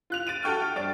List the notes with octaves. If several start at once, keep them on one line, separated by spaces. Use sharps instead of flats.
F4 F#6 F7
A6 D7 D#7 F7
F#4 A4 G5 C#6 F6
G5
G2 D4 A6 D7